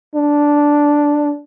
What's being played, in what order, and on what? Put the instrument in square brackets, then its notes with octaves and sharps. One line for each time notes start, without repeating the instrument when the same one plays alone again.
[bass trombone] D4